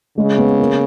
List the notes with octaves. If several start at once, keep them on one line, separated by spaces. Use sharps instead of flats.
C#3 G#3
B3
A#3